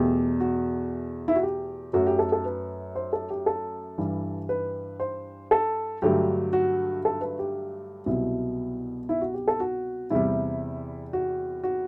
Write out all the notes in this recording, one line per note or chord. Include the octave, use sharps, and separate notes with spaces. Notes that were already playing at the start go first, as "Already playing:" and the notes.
Already playing: E2 B2 A3 G4
F#4
E4
F#4
G4
F#2 F#3 A3 F#4
G4
A4
A4
B4
C5
A4
G4
A4
G2 E3 G3
B4
C5
A4
G2 D3 F#3 A3 G4
F#4
A4
B4
G4
C2 B2 F#3 E4
E4
F#4
G4
A4
F#4
E2 C3 G3 E4
F#4
F#4